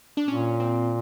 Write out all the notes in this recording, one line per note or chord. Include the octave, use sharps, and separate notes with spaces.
D4
A#2 C#4
C4